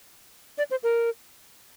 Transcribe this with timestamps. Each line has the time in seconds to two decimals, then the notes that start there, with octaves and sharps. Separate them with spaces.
0.58 D5
0.71 C5
0.83 A#4